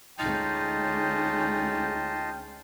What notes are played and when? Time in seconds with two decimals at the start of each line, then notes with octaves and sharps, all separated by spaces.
0.19 D2 G#3 C#4 D#4 F4 D#5 G5 A5